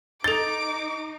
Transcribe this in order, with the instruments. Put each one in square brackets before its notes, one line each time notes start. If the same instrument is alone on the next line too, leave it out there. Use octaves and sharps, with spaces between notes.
[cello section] D#4 [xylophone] A4 G7 [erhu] D6 [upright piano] A6